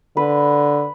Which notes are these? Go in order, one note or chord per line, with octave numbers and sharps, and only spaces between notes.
D3 B4